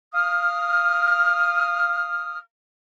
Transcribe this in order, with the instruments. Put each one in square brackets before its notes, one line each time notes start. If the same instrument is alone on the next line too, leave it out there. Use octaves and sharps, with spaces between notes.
[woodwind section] F5 D#6 F6